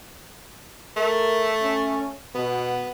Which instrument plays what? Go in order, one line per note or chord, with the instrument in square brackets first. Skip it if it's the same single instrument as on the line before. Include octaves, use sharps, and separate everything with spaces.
[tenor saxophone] A3 [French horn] A#4
[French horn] C#4
[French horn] B2 [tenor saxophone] B3